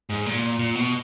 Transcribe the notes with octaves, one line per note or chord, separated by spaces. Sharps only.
G#2
A#2
A#2
B2